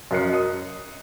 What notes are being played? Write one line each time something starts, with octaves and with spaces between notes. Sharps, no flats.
F#2 A#4 D#5 F#6 C7 C#7
D#6